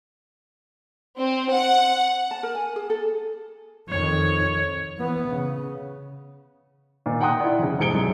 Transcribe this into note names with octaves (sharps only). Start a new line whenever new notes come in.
C4
F#5
A5
A#4
G#5
G#4
A4
F2 D#3 C#5
E3 B3
C#3
A#2 D#3
F#5 G5 A#5 C6 D#6 F#6
E4 D5
F2 C#3
E1 G#2 G#4 C#7 D7 G7
C2 F#2